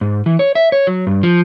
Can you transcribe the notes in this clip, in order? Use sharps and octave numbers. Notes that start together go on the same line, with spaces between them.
G#2
E3
C#5
E5
C#5
F#3
G2
F3